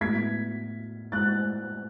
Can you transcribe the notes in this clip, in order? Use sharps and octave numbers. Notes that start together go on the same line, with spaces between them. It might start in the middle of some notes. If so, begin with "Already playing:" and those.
A2 G#3 B3 G#6 B6
F#6 A6